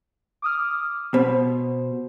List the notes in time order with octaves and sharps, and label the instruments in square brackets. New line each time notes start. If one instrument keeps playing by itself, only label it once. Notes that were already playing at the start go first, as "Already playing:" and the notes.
[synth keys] D6 D#6 F6
[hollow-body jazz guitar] B2 [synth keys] C5